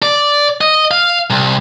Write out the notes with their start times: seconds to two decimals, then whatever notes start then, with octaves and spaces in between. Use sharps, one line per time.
0.03 D5
0.61 D#5
0.91 F5
1.30 C2